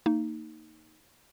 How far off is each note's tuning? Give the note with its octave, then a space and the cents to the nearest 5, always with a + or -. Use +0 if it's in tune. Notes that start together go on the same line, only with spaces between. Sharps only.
A#3 -30 D#4 +0